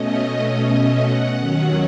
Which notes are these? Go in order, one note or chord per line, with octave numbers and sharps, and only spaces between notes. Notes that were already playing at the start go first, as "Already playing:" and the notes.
Already playing: B2 A3 C#4 D#5
F#5
D#2 D#3 F#3 C#4 F#5